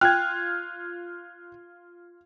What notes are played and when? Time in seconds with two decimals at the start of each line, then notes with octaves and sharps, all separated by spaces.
0.01 F4 G5 F6 F#6 G#6